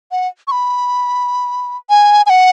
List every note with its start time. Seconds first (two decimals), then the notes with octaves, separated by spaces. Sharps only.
0.11 F#5
0.47 C#6
0.51 B5
1.90 G#5
2.26 G#5
2.30 F#5